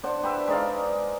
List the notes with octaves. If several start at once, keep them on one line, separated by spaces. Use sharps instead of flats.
D4 C5 F#5
G4 B4 E5
G#3 D#4 D5 F5